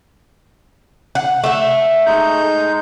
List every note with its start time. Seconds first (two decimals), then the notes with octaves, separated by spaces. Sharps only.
1.15 F#5
1.44 A3 E5
2.06 G#3 D#4 G6